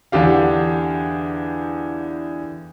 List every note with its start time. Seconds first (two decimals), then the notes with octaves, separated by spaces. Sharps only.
0.12 E2 D3 D4 G4 F5